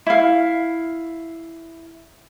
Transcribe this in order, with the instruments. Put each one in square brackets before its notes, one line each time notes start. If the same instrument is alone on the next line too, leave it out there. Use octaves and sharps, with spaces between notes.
[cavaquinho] E4 F5